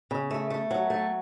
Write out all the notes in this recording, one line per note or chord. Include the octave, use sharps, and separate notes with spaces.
C#3
A3
A3
F#3
A3